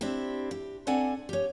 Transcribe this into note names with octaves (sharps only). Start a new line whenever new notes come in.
C4 D4 E4 G4
G4
C4 D4 A4 D5 F#5 G#5
G4 C#5